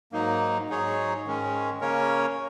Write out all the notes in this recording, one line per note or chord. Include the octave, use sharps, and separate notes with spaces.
G#2 F#3 A#3 D#4
G#2 F#3 D#4 G#4 C#5
G#2 D#3 G#3 C#4
C#3 A#3 C#4 A#4 C#5